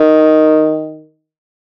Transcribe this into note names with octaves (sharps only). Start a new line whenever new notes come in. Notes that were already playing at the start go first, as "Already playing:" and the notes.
Already playing: D#3